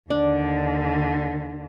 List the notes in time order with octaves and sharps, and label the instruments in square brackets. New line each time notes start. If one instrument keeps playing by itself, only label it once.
[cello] D#2 D3 [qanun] D4 [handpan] D5